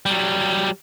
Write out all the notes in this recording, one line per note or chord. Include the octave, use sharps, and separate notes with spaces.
F#3 G3